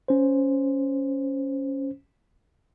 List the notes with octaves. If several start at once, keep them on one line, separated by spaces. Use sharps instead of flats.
C#4 C5